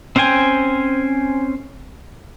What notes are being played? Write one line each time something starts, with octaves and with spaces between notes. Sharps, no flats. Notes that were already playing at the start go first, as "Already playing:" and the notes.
C4 C#4 C5 G5 G#5